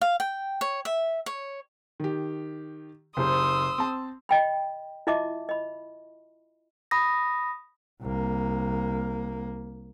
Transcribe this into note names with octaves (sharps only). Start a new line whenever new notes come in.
F5
G5
C#5
E5
C#5
D#3 G4
F#1 G4 C5 C6 D#6 E6
C4 A5
D#5 G5 B5
E4 F4 D#5 E5 A5 D6
D#5 B5
B5 D#6 A#6
C2 A#3